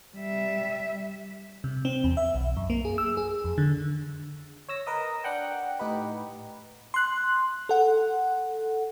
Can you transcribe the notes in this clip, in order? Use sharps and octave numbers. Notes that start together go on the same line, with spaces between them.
G3 E5
C3
C4
E2
E5
B1
F#2
A#3
G#4
E6
G#4
F2
D3
C#5 E6 A#6
A#4 B4 D#5
D4 F#5 G5
A2 D#4 G4 B4
C6 F#6
A4 F#5